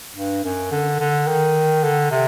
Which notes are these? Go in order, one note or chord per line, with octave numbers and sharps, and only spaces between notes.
G2
F#2
D3
D3
D#3
D3
C3